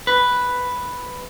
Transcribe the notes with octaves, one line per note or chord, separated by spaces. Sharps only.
B4